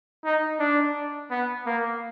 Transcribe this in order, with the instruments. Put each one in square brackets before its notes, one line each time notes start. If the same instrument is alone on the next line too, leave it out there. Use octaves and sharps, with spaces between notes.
[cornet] D#4
D4
B3
A#3